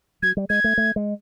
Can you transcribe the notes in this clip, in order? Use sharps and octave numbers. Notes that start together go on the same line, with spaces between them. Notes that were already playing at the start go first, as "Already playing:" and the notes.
F#3 G#6
G3
G#3 G#6
A3
A3
G#3